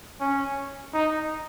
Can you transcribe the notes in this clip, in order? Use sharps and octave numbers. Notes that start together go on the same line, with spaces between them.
C#4
D#4